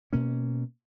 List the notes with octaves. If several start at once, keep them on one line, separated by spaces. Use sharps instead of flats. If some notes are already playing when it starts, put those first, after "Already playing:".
B2 A#3 C#4